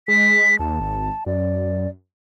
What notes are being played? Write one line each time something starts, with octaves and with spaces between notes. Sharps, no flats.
G#3 B6
D#2 A5
G#1
F#2 D5